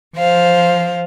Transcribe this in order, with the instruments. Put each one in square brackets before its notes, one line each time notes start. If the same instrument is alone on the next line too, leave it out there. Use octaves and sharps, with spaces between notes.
[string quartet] F3 C5 F5